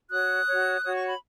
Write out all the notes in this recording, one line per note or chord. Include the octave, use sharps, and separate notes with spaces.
F#4 C#5 D#6 F#6
F#4 C#5
F#4 C#5 D#6
C#6
B5